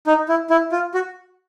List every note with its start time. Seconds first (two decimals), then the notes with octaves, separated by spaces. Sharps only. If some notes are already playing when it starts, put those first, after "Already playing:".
0.07 D#4
0.29 E4
0.50 E4
0.72 F4
0.94 F#4